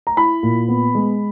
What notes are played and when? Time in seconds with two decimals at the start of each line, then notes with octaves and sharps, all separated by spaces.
0.07 A#5
0.17 E4 B5
0.43 A#2
0.68 B3
0.95 G#3